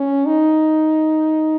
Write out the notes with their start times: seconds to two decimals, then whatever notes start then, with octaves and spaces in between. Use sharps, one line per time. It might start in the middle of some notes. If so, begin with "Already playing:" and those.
Already playing: C#4
0.26 D#4